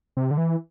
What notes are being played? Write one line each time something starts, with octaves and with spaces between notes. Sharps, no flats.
C3
D3
E3